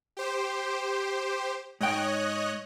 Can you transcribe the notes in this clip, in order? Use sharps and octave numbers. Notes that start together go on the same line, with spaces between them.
G4 C5
G#2 C#5 D#5 G5 F#6